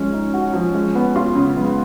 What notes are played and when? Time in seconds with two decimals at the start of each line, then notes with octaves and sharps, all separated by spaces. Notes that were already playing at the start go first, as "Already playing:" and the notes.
Already playing: F3 G#3 C#4
0.13 D#4
0.34 F#4
0.53 F3
0.74 G#3
0.95 B3
1.16 F4
1.35 C#3
1.56 G#3 B3